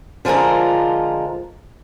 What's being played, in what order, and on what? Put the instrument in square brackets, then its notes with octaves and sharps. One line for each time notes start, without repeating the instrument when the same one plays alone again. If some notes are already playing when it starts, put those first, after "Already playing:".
[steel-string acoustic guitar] D3 F3 G#3 F4 A#4